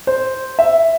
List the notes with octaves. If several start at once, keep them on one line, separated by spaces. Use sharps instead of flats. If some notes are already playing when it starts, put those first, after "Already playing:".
C5
E5